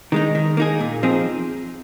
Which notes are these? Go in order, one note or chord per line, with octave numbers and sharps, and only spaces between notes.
D#3 G#3 D#4
D#3
A#3 D#4 G#4
A#2
F3 C4 D#4 G#4